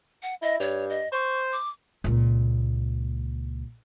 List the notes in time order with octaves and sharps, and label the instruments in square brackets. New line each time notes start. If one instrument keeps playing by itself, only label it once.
[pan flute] F#5
[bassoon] E4 [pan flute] D#5
[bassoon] G2 [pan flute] C#5
[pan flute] D#5
[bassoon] C5 [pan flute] C#6
[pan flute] D6
[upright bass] C#2 A#2